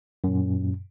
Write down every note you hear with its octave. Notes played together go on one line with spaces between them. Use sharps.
F#2 A#2